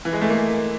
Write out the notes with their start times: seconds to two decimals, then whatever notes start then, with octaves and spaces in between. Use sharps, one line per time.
0.05 E3
0.13 G#3
0.21 A3
0.30 A#3